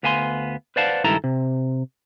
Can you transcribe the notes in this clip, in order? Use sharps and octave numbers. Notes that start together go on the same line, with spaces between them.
D2 B3 F5 G#5 B5 C6
B4 C5 D5 F5 F#5 A5
C#2 G2 D#3 E4 A4 A#5
C3